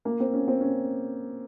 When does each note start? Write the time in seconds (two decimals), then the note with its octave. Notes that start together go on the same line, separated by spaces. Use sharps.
0.05 A#3
0.20 C4
0.34 C#4
0.48 C4
0.61 C#4